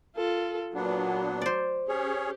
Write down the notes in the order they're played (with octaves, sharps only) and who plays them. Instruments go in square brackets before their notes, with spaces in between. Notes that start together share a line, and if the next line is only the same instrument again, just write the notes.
[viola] F4 A4
[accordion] A#2 B3 D4 [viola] F#3
[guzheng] C5 D5
[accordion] C#4 G#4 C#5 [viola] G4